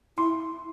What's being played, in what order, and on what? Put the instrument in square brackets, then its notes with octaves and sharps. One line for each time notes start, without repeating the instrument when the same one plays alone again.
[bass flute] E4 [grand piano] C6